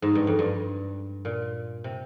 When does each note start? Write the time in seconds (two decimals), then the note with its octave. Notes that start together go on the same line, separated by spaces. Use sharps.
0.02 G#2
0.15 G2
0.27 F2
0.39 G2
1.25 A#2
1.84 C3